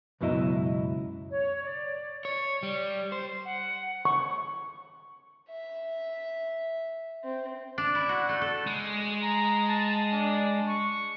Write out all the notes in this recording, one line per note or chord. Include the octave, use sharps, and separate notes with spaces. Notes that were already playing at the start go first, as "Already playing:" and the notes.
C#2 F#2 B2 F#3 E4 D#5
C#5
D5
C#5
G3
C5
F#5
C#6
E5
C4
D4
E4
F#4
A3
A4
G#3
A#5
A5
D4
C#6